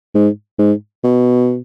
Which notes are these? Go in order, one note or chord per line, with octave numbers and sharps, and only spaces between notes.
G#2
G#2
B2